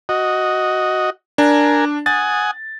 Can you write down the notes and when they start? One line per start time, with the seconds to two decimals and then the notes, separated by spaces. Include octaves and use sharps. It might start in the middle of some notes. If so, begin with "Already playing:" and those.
0.09 F#4 D#5
1.38 D4 A#4 G#5
2.06 F#5 G#5 D#6 A6